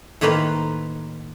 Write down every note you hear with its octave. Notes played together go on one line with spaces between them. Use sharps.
A2 D#3 A#3 B4 C5 F5